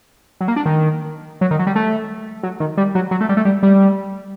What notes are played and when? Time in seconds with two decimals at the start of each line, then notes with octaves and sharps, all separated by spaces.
0.41 F#3
0.48 A#3
0.56 D4
0.66 D#3
1.41 F#3
1.51 D#3
1.59 F#3
1.67 G3
1.75 A3
2.43 F#3
2.60 D#3
2.77 G3
2.95 F#3
3.11 F#3
3.21 A3
3.29 G3
3.37 A3
3.45 G3
3.63 G3